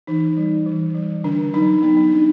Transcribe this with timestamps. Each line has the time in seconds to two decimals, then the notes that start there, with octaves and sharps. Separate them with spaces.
0.07 E3 D#4
0.37 G3
0.66 E3
0.95 G3
1.24 D3 D4
1.53 F#3 D#4
1.82 B3 D#4
1.97 D#4
2.11 D4